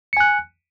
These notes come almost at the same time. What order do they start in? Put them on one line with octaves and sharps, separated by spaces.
C#7 G#5 F#6